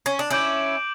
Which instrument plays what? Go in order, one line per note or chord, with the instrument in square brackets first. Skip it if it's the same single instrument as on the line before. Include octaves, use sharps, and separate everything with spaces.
[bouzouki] C#4
D4
[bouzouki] C#4 E4 [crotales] D6 G6 D7 F#7